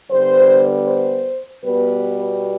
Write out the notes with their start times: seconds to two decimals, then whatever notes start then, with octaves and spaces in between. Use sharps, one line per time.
0.10 D3 G3 B3 C5
0.87 C5
1.63 B2 G3 B3 B4